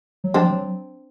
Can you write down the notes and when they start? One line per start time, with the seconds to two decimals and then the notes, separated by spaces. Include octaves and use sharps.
0.24 F#3
0.34 F3 C4 D4
0.51 F#3